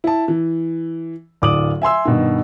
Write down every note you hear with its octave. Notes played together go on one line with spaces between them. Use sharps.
E4 A5
E3
D1 D5 D6 D#6 F#7
E5 G#5 C6 E6
G2 B2 D#3